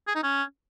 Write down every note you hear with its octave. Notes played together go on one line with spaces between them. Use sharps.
G#4
D#4
C#4